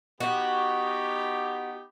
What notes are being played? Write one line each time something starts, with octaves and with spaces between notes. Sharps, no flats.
B3 D#4 F#4 G4